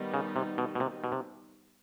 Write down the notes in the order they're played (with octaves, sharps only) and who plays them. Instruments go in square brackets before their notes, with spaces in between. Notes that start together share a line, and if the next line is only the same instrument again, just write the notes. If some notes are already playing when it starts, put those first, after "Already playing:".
Already playing: [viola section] D#3 G3 B3 D#4
[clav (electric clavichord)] C#3
C3
B2
B2
C3
B2
C3